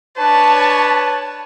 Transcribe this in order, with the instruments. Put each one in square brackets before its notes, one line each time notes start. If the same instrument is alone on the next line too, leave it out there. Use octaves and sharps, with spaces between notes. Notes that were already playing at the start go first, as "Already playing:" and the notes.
[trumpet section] D4 B4 C#5 [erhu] A5